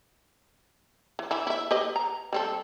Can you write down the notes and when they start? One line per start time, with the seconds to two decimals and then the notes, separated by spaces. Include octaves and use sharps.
1.19 E3
1.31 E3 E4
1.47 E4 E5
1.71 G4 B4 D#5
1.96 A#5
2.33 G3 C4 A4